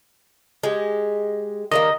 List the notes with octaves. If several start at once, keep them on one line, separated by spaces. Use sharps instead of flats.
G#3 G4
D#3 G3 A#3 D#5